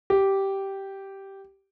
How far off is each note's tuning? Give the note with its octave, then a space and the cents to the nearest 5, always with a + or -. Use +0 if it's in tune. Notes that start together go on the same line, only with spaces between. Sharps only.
G4 -10